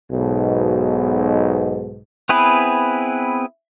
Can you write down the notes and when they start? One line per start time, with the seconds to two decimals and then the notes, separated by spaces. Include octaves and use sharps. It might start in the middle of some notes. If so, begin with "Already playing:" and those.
0.12 B1 G#2 B2
2.29 B3 C4 E4 G#4 B4